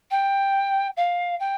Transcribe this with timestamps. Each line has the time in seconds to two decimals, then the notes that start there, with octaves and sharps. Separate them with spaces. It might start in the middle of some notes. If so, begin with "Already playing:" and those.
0.11 G5
0.97 F5
1.40 G5